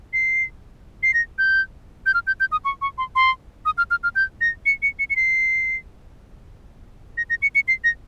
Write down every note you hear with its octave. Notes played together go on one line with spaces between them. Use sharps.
C7
C7
A#6
G6
G6
F6
G6
G6
D#6
C#6
C#6
C6
C6
D#6
F6
F6
F6
G6
A#6
C#7
C#7
C#7
C#7
C7
A#6
A#6
C#7
C#7
C7
A#6